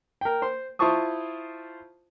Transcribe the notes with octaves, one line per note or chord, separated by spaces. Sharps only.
A#4 G5
C5 C6
E4 F4 C5 A5 C#6 D#6